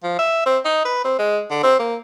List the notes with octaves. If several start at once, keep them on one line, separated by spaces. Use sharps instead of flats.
F3
E5
C4
D#4
B4
C4
G#3
D3
C4
A#3